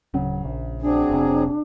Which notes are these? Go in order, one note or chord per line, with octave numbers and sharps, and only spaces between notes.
D1 C#3 F#3
A#1
F#3 C4 D4 G#4
F1 C3